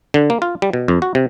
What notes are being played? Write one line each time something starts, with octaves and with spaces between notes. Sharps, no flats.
D3
A#3
F4
G3
B2
F2
F#4
C3